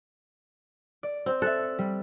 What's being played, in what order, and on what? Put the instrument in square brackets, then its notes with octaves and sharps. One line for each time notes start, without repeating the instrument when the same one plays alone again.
[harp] D5
[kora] C4
[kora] A4 [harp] E5 F#6
[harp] G3